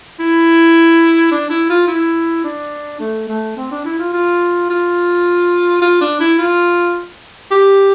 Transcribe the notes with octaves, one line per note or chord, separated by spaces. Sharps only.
E4
D4
E4
F4
E4
D4
A3
A3
C4
D4
E4
F4
F4
F4
F4
D4
E4
F4
G4